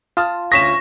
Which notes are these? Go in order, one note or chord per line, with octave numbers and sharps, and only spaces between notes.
F4 A5 D#6 F6
D2 C#4 C#6 D#6 A#6 B6 E7